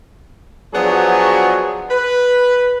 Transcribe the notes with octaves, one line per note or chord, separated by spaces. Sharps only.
F3 F#3 B3 D4 F#4 G#4
B4